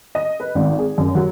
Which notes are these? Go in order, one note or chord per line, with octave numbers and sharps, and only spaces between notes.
D#5
B4
G#1
G#4
F#2
F#3